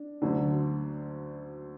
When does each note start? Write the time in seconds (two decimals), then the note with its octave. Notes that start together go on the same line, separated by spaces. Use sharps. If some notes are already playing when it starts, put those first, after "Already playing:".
Already playing: D4
0.22 D2 D3 F#3